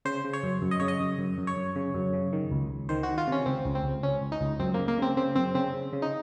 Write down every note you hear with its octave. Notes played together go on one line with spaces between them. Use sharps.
C#3 C5
C#3
C#5
F#2
F#2
D#5
C#3 C#5
D#5
F#2
F#2
F#2
C#5
F#2
C#3
F#2
C#3
D#3
C#2
C#2
D#3 C5
F#4
D#3
F4
C3 C#4
C#2 C4
C#2
C4
C#2
C#2 C#4
C#2
D#4
C#2
F#2 C4
C#3 A#3
A#3
C#3 C4
C#3 C4
F#2 C4
C#3 C4
C#3
C#3
D#4